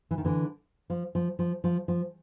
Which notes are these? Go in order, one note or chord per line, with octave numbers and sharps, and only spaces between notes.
E3
D#3
D3 E3
F3
F3
F3
F3
F3